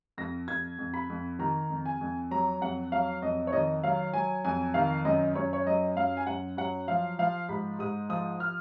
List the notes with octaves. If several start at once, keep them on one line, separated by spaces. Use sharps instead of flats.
F2 A#6
F2 G#6
F2
B5
F2
D#3 A#5
F2
G#5
F2
F#3 A#5
F2 F#5
F#3 F5
F2 D#5
C#5
D#3 D#5
F#3 F5
F#3 G#5
F2 G#5
D#3 F5
F#2 D#5
F#2 C#5
C#5
F#3 D#5
F#2 F5
G#5
F#2 F#5
F#3 F#5
F3 F5
F3 F5
G#2 B5
G#2 D#6
F3 D#6
F6